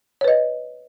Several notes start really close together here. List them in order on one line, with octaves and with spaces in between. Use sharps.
C#5 B4 D#5